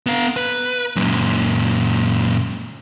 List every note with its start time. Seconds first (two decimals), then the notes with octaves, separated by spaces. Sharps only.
0.06 B3 F5
0.37 B4
0.96 F#2 A#2